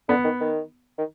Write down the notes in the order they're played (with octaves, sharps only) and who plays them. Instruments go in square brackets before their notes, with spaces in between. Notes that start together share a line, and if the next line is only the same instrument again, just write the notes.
[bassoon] D3 [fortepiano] B3
[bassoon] D#3
D#3
D#3